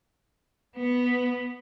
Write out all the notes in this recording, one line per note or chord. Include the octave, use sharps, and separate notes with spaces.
B3